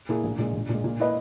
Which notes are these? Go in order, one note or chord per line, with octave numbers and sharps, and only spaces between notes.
A#2 A#3 E4 G#4
A#1
A#2 G#3
A#1
A#2 G#3
A#2
A#3 E4 B4 D#5